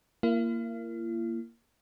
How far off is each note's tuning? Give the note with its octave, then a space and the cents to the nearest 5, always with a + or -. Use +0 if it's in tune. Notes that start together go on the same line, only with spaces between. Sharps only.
A#3 -5 E4 +45